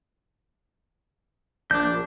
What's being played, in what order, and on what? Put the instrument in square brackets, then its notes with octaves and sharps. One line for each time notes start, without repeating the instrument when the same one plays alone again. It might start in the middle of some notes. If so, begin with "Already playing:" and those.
[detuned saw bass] A#1 [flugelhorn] D4 [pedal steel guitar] D6 G6